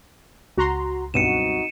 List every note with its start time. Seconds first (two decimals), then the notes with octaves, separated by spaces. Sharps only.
0.58 C#2 F#4 A#5 C6
1.14 B1 G2 C4 D#4 F#4 C#7 D#7 E7